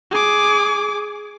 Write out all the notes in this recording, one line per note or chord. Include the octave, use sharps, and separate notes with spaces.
G#4 D6